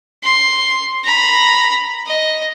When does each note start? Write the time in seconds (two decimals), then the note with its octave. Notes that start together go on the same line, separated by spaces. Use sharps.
0.23 C6
1.04 A#5 B5
2.06 D#5